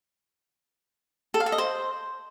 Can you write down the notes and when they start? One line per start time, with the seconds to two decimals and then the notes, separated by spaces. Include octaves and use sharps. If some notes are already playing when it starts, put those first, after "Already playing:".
1.34 A4
1.40 F5
1.46 A4
1.52 D#5
1.58 C5